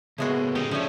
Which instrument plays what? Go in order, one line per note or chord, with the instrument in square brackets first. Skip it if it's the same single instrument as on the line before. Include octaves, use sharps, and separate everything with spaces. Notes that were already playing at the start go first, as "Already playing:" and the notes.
[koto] A2 G#3 F#4 [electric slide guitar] C#3 A#3 B4 [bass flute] B3
[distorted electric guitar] C#4 G4 [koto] D#4
[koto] F3 A3 [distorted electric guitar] C#4 D4